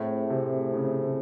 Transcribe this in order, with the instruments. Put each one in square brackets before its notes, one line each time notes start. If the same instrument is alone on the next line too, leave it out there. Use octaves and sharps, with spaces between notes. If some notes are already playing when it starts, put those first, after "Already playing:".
Already playing: [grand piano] A2 [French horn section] A3 C4 E4 G#4 C5
[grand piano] C3
C#3
C#3